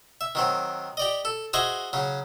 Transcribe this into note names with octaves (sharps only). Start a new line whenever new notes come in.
E5
D#3 F#3 C4
G4 D5 D#5
A4
F#4 G#4 C5 D#5 E5 G#5
C#3 F#3